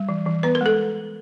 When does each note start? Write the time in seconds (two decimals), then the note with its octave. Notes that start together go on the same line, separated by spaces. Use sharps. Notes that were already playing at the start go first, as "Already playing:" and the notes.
Already playing: G3
0.09 E3
0.26 E3
0.43 B3 B4
0.55 A#4
0.61 G#3 A4